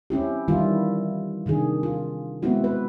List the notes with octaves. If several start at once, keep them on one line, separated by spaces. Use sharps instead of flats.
C4 C#4 E4 G4
D#3 E3 G3 E4 F4
C3 D#3 D4 G#4
F4
G#3 B3 C4 E4 F#4
B4